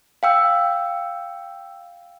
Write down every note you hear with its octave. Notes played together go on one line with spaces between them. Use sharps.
F5 G5 E6